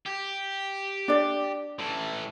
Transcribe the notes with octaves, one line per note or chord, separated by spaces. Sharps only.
G4
D4 D5
A2 E3